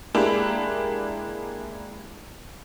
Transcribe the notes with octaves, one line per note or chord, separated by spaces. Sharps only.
G#3 A#3 D4 E4 G4